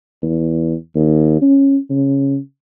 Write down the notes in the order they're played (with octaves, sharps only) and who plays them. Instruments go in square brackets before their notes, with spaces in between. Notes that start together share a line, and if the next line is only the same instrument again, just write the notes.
[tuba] E2
D#2
C#4
C#3